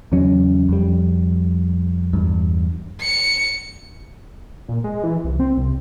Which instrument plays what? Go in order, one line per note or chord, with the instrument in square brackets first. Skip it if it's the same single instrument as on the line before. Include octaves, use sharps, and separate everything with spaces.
[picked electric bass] E2 C#3 F#3 C#4
F2 G3
E2 G2
[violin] C#7
[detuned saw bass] A#2
G#3
E3
C2
C4
C2